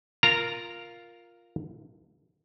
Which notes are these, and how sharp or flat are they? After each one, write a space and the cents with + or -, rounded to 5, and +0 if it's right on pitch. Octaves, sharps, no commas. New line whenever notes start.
F4 +0 A#4 +0 A#5 -15